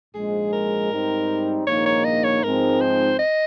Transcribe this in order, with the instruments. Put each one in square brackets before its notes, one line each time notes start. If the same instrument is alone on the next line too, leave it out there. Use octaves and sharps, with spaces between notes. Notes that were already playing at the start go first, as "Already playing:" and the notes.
[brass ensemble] A#1 G#2 F3 G#3 [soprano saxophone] G#4
[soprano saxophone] A#4
[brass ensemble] G#2 G3 C4 D#4
[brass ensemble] A#1 G#2 D#3 A#3 D#4 [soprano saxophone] C#5
[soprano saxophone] C#5
D#5
C#5
[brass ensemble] G#2 F3 G#3 C4 D#4 [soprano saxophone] A#4
[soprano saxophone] C5
D#5